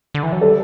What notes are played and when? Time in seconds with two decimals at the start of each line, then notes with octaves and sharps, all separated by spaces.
0.15 D3
0.23 E3
0.32 F#3
0.41 G3 A4